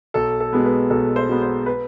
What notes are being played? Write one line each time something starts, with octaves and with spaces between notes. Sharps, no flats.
B1 A4
A4
B2 G#3 B3
B4
B1 A4
C5
B2 G#3 B3
C5
B4